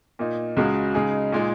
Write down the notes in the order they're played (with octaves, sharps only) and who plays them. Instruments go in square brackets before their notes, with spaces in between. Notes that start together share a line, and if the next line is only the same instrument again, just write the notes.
[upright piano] A#2 A#3 D#4
C#2 C#3 G#3 F#4
C#3 G#3 D#4 G#4
A#2 G#3 D#4